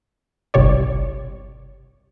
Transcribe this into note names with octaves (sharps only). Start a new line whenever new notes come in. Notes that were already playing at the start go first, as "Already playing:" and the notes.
G1 C2 C3 C#5 D5